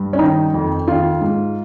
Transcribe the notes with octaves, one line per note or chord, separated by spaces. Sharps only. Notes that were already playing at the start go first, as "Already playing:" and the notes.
Already playing: G2
C#4
D#3 D#4
F2
D#3 F4
G#2